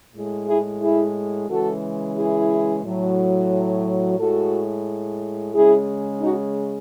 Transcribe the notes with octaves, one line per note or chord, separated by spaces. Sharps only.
A2 G#3
E4 G#4
E4 G#4
C#3 E3 G#3 F#4 A4
E4 G#4
A2 F#3
A2 G#3 F#4 A4
C#3 G#3 E4 G#4
D#4 F#4